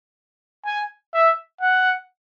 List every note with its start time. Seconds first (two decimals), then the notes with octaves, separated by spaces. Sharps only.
0.65 G#5
1.14 E5
1.61 F#5